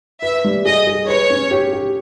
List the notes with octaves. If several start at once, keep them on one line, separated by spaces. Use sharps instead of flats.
B4 E5
G3
G#4 D#5
G#4
B4 C#5
C#4
G4
G4